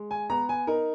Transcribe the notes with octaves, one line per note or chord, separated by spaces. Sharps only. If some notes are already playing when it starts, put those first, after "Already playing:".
Already playing: G#3
G#5
B3 A#5
G#5
D#4 A#4